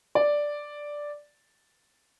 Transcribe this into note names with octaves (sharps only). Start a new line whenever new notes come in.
D5